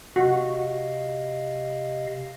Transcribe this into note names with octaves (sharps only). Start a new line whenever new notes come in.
C3 F#4 D#5 F5